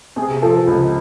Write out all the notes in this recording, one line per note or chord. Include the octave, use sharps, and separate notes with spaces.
C3 G#4
F3 A4
C#2